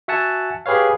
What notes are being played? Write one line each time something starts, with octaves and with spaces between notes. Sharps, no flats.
F#4 E5 F#5 G#5 A5
G4 G#4 B4 C#5 F5